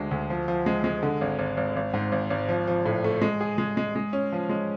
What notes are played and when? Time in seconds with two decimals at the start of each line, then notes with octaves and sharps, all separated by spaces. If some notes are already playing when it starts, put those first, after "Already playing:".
Already playing: D2 G#3 D4
0.11 D2
0.30 F3
0.48 F3
0.66 G#3
0.84 G#3
1.03 D3
1.21 G#1
1.39 G#1
1.57 G#1
1.76 G#1
1.94 G#2
2.12 G#1
2.30 G#1
2.49 F3
2.68 F3
2.86 A2
3.04 A3
3.22 G#3
3.41 G#4
3.58 G#3
3.77 G#3
3.96 G#3
4.13 C#4
4.32 F3
4.49 G#3